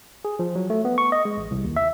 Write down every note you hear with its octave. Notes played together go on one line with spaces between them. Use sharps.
G#4
F3
F#3
A3
B3
C#6
D#5
G#3
A1
C2
D#2
E5